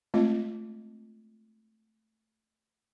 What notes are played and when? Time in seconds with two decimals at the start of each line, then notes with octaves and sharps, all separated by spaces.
0.14 G#3 A3 C4 F4 D#5